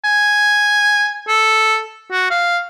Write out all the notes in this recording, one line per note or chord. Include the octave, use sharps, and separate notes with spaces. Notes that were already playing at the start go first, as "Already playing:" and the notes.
G#5
A4
F#4
F5